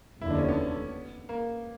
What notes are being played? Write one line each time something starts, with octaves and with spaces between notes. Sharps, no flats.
F1 D#2 D3 E4
D4
C#4
B3
A#3